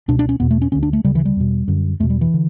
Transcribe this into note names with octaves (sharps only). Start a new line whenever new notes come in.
C#2 B2 D4
D4
C#4
E2 B2 B3
A3
C#4
D2 D3 C#4
D4
A3
D2 C#3 G3
E3
G3
E2 B2
F#2 D3
E2 B2 A3
G3
E3
D3